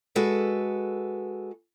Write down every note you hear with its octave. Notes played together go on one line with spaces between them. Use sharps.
G#3 F#4 A4 B4